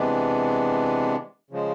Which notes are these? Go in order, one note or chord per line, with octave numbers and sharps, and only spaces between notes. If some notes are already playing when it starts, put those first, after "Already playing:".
Already playing: C3 E3 G#3 B3 D4
C#3 F3 G#3